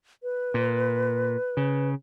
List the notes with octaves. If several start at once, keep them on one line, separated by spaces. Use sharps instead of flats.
B4
A#2
C#3